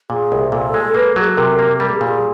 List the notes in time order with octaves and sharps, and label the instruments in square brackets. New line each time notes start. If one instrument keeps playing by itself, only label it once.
[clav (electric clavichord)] A#2 [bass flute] G#4
[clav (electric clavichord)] C2
[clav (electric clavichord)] A#2 [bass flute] A4
[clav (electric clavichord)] G#3
[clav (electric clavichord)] A#3 [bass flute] B4
[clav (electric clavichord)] F#3 [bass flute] G#4
[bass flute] A4
[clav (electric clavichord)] C3 [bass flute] A#4
[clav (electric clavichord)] A#3
[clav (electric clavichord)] G3 [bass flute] A#4
[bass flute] A4
G#4
[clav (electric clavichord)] A#2
[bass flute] G#4